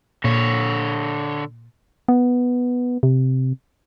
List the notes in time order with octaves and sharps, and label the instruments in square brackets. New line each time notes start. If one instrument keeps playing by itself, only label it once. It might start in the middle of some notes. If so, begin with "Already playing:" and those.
[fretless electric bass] A#2 [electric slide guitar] D3 C#5
[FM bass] B3
C3